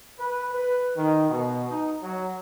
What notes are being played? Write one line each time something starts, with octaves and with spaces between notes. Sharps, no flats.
B4
B4
D#3
B2
D#4
F#3